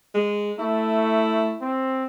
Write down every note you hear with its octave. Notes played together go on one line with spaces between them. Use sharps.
G#3
A3 E4
C4